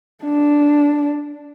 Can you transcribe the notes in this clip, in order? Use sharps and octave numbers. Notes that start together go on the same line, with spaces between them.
D4